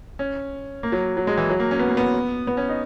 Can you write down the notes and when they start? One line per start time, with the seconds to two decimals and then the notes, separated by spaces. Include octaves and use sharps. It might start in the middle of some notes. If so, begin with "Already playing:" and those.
0.19 C#4
0.83 A#3
0.92 F#3
1.17 F#3
1.27 G#3
1.37 E3
1.49 F#3
1.60 A#3
1.71 C#4
1.79 B3
1.89 A#3
1.97 B3
2.47 B3
2.57 C#4
2.69 D#4